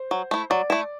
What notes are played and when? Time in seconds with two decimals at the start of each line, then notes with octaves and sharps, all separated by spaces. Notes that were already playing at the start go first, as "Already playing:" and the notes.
Already playing: C5
0.11 F#3
0.31 A3 E4
0.50 F#3 D5
0.70 A3 E4